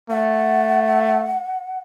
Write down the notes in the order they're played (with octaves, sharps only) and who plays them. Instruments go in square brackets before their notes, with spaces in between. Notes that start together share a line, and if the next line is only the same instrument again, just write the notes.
[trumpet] A3 [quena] F#5